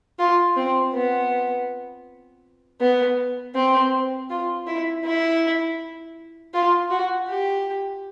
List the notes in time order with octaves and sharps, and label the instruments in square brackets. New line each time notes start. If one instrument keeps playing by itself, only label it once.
[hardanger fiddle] F4
C4
B3
B3
C4
F4
E4
E4
F4
F#4
G4